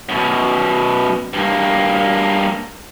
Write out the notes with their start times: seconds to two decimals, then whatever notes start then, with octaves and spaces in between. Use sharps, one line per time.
0.09 F#2 B2
1.33 G2 A#3